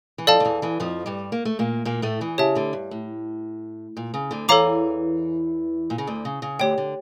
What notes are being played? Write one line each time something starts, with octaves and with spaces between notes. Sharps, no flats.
E3
F2 F3 A4 D5 F5 A5
D3
E2 E3
E2 E3
F2 F3
G2 G3
A#3
A3
A#2 A#3
A#2 A#3
A2 A3
E2 E3
C#3 G4 C#5 E5 A5
D2 D3
G2
A2
A#2
C#3
D2 D3
E2 E3 A4 C#5 F5 A#5 D6
A#2
C#3
D2 D3
C#3
C#3
D2 D3 G4 C#5 G5
D3